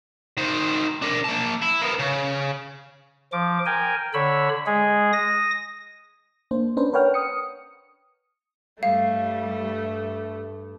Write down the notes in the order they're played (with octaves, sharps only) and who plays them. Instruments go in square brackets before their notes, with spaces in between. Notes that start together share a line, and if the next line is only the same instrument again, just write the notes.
[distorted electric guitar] D#3 C5
D4 A#4
A#3 A5
E4
A#3 B3
C#3
[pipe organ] F3 D6
A#4 G5 G#5
D3 C#5 B5 E6
G#3 G#4
D#6 A#6
[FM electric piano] A#3 D4 C5
C#4 D4 B4 C5
A#4 B4 C#5 F#5 G5 F6
D#6 C#7
[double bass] G2 [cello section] G3 [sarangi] A3 [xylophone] F5